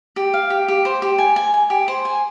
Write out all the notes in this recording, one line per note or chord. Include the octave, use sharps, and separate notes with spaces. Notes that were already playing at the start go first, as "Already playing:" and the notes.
G4
F5
G4
G4
C5
G4
G#5
G#5
G#5
G4
C5
G#5